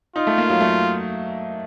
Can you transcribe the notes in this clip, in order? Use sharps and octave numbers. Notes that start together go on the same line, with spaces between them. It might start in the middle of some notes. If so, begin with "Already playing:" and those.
D#4 F4
A3
A#3
F#3
A3